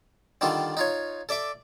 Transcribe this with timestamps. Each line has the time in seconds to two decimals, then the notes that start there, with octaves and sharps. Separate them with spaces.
0.41 D3 D#3 G3 F4 A4
0.77 D#4 F4 C#5
1.29 A4 D5 E5 D6